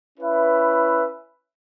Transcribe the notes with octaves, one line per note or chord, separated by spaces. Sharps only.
C#4 E4 B4 E5